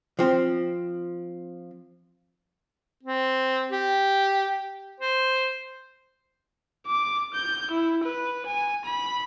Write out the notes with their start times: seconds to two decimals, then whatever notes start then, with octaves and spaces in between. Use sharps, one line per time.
0.19 F3 C4
3.03 C4
3.71 G4
5.00 C5
6.87 D6
7.34 G6
7.71 E4
8.04 B4
8.46 G#5
8.85 B5